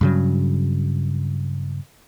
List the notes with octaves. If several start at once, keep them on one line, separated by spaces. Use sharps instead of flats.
G2 C#3 F#3